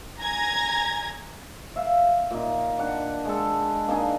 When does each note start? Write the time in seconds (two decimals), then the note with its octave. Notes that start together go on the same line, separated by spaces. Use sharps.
0.19 G#5 A#5 G#6 A#6
1.76 E5 F5
2.30 A#2 D#4
2.79 D4 F#5
3.25 G#3 A4
3.87 A#3 D4 D#4 G#4